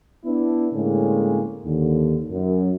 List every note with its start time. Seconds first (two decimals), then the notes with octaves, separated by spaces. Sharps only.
0.25 B3 D4 E4
0.73 A2 D3 G#3 A#3 C4 C#4
1.64 D#2 D3
2.31 F#2